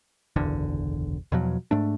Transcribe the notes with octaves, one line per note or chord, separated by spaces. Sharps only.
F#1 B1 E2 D3
E2 B2 F3 F#3
G#2 A3 D4